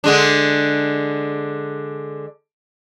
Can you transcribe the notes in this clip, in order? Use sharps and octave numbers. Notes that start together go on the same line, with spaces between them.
D3 G#3 D4